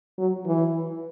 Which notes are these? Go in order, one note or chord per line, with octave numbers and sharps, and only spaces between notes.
F#3
E3